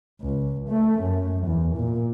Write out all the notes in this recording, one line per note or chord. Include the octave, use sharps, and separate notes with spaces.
C#2
A3
F#2
E2
A#2